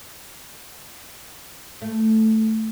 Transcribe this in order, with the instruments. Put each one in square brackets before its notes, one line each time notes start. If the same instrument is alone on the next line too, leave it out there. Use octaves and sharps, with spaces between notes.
[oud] A3